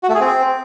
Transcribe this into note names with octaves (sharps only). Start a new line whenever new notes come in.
F#4
A3
G#4
C4